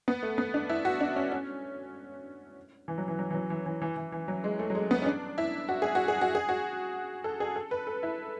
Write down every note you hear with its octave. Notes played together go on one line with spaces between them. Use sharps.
B3
A3
B3
D4
E4
F#4
D4
C#4
C#4
E3
F#3
E3
F#3
E3
F#3
E3
E3
E3
E3
E3
F#3
G#3
A3
F#3
G#3
B3
C#4
D4
E4
F#4
G#4
F#4
G#4
F#4
G#4
F#4
A4
G#4
A4
B4
A4
E4